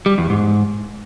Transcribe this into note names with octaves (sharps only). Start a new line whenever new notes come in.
G3
E2
G#2